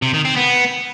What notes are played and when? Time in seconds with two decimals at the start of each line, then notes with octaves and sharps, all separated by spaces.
0.02 C3
0.14 D#3
0.25 C4
0.36 B3